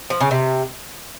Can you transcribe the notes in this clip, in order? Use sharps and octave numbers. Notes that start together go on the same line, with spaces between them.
F3
C#3
C3